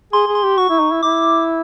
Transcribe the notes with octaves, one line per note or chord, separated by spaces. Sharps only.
G#4 C6
G#4
C6
G4
F#4 C#6
E4
D#4
E4
E4 D6